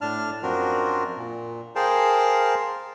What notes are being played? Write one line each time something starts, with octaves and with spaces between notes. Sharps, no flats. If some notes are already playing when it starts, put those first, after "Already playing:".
A2 D4 A5 F6
F#2 F3 C4 D4 F#4 A#4
A#2
G#4 A#4 C5 F5 G5 A5